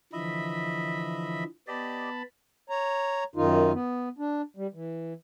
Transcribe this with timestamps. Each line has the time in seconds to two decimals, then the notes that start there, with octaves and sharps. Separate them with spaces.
0.13 D3 E3 F3 D#5 E5 B5
1.68 B3 G4 D5 D#5 A5 B5
2.70 C#5 A#5
3.36 F#2 D#3 D#4 F4
3.73 B3
4.19 D4
4.57 G3
4.74 E3